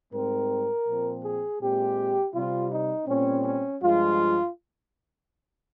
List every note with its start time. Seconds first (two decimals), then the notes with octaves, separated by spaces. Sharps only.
0.11 G#2 G3 C4 A#4
0.86 A#2 F3 C4
1.23 G#4
1.59 A#2 G#3 C4 G4
2.32 C3 G3 C4 F4
2.70 D#4
3.06 A#2 G3 C4 C#4
3.43 C#4
3.81 G2 F3 G#3 F4